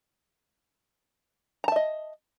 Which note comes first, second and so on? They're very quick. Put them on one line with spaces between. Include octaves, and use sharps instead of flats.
A#5 A5 E5 D#5